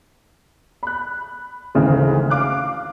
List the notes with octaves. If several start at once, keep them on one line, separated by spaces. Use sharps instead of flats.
B5 F#6
G#1 D2 C#3 E3
F5 D6 F6 F#6